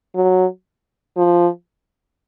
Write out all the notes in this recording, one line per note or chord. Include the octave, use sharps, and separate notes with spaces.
F#3
F3